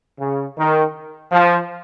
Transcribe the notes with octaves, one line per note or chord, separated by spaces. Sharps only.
C#3
D#3
F3